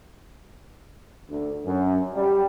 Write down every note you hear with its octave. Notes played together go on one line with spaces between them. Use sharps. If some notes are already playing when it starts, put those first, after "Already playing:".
D2
F#2
G3